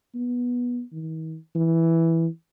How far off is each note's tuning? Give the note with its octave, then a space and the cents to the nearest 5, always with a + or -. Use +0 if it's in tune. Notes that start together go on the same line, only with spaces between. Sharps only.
B3 -15
D#3 +45
E3 +0